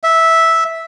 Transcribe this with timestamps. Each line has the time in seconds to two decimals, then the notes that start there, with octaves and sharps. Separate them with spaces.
0.03 E5